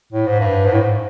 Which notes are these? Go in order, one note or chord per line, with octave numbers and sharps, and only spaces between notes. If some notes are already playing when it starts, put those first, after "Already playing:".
A2
G#2
G2
G#2
A2
G#2